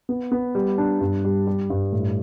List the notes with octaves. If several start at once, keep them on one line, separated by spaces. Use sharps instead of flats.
B3
B3
G3
D4
G2
G3
G3
G2
A2